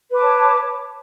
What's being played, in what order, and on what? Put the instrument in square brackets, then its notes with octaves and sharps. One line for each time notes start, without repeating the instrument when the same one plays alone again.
[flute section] B4
D6
A5
C#5